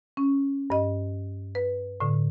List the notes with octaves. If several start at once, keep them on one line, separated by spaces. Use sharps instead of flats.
C#4
G2 D#5
B4
A2 D3